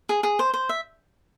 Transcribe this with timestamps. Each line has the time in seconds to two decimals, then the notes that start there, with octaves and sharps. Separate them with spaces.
0.09 G#4
0.23 G#4
0.39 C5
0.54 C5
0.69 E5